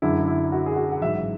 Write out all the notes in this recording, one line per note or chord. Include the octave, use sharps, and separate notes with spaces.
F#2 D3 G#3 E4
E4
F#4
G#4
F#4
F#5
A1 G#2 F#3 E5